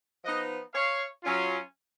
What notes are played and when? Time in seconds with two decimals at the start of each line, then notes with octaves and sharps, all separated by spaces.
0.24 F3 B3 D#4 B4 D#5
0.74 C#5 F5
1.23 F#3 C#4 F4